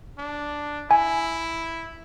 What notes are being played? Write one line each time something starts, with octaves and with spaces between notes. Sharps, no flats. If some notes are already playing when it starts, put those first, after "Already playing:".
D4
E4 G#5